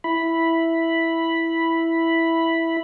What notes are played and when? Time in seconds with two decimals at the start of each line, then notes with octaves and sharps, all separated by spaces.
0.04 E4 B5